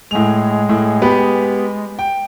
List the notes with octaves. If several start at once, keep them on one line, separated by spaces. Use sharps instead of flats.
A2 G#3 F7
A2
B3 G4 B4
G5